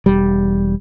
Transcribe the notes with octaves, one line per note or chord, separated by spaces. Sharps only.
E1 G3